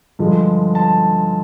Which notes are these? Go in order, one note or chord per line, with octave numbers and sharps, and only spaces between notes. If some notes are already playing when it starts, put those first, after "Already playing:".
G2 D3 F3 G#3
A5